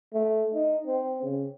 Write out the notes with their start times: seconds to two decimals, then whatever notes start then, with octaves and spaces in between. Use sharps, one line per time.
0.14 A3
0.54 D#4
0.87 C4
1.23 C#3